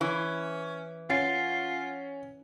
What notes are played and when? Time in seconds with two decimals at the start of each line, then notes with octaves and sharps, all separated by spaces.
0.01 E3 C#4
1.10 C#4 F4 F#5 A6 C7